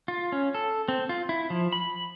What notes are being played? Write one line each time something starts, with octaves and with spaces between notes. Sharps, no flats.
F4
C#4
A4
C4
F4
E4
F3
B5